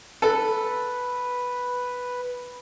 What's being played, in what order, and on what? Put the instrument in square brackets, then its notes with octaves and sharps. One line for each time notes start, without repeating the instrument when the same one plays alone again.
[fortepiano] A4 [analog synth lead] B4